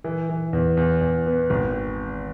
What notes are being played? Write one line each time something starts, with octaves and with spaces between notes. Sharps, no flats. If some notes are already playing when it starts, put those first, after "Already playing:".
E3
E3
E2
E2
E2
B3
G#1